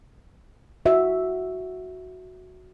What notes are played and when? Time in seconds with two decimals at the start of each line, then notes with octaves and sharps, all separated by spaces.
0.86 F#4 E5